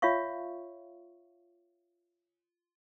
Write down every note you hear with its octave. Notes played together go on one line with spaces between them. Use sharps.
F4 C#5 E5 F5 C#6